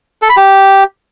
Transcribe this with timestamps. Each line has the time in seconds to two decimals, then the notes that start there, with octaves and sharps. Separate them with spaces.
0.22 A4
0.29 B5
0.37 G4